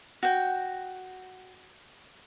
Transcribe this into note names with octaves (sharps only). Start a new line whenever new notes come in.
F#4 G5